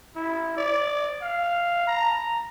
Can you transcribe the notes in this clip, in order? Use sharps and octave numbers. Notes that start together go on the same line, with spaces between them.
E4
D5
F5
A#5